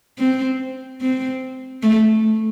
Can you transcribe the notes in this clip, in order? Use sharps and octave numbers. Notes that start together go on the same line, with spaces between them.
C4
C4
A3